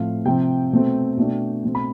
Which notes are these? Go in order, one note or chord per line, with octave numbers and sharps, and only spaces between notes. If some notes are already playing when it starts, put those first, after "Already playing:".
Already playing: A2 F3 A3 C4 F5
C3 F3 C4 G5
B2 A3 C4
B2 A3 D4
B2 A3 C4
B5